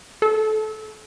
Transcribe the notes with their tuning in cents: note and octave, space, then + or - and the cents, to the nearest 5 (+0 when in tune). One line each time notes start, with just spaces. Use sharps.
A4 -25